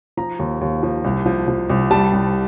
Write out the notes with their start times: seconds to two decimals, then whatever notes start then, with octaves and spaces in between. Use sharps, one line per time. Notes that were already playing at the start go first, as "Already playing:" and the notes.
0.17 F3 A#5
0.39 D#2
0.61 D#2
0.83 F3
1.04 C2
1.26 F3
1.48 F3
1.69 C2
1.91 G3 A5
2.13 C2